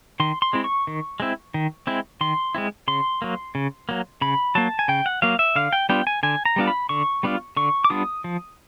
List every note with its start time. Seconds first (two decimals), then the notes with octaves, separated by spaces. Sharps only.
0.20 D#3 C6
0.42 C6
0.53 G#3 C4 E4
0.64 C#6
0.87 D#3
1.20 G#3 C4 E4
1.54 D#3
1.87 G#3 C4 E4
2.21 D#3 C6
2.55 G#3 C4 E4
2.88 C#3 C6
3.22 F#3 A#3
3.55 C#3
3.89 F#3 A#3
4.21 C#3 B5
4.55 F#3 A#3 A5
4.79 G#5
4.88 C#3 G5
5.06 F#5
5.22 F#3 A#3 F5
5.39 E5
5.56 D3 F5
5.73 G5
5.89 G3 B3 D4 F4 G5
6.07 G#5
6.23 D3 G#5
6.45 A#5
6.56 G3 B3 D4 F4
6.67 B5
6.89 D3 C#6
7.23 G3 B3 D4 F4
7.57 D3 C#6
7.84 D6
7.90 G3 B3 D4 F4 D#6
8.24 F3